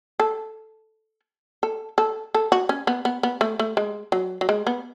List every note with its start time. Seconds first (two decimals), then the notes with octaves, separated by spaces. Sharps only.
0.20 A4
1.63 A4
1.98 A4
2.34 A4
2.52 F#4
2.69 C#4
2.87 B3
3.05 B3
3.23 B3
3.41 A3
3.59 A3
3.77 G#3
4.12 F#3
4.41 F#3
4.49 G#3
4.67 B3